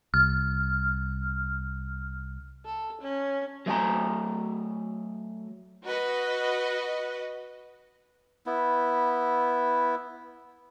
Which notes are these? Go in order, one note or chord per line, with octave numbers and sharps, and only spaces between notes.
C2 F6
A4
C#4
F#3 A3 E5 G5 G#5 A#5
F#4 B4 D#5
B3 E4